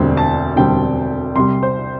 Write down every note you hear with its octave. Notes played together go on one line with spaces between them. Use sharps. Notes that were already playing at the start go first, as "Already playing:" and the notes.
Already playing: E1 D2 D3 G3 C4
A5
E1 D2 D3 G3 C4 G5
C2 C3 G3 C6
C5